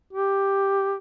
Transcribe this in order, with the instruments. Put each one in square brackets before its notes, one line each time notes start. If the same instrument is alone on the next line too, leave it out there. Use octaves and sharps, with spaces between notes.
[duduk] G4